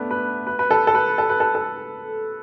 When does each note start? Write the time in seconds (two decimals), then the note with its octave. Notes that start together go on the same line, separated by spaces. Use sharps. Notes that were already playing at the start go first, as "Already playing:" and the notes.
Already playing: A3 B3 D4 B4
0.11 B4
0.47 B4
0.59 B4
0.71 A4
0.87 A4
0.95 B4
1.18 A4
1.30 B4
1.40 A4
1.55 A4